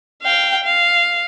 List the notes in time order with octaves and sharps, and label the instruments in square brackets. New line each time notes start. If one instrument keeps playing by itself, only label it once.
[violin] F5 G5
F5